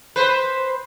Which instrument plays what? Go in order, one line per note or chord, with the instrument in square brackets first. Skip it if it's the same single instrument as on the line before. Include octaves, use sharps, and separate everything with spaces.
[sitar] B4 C5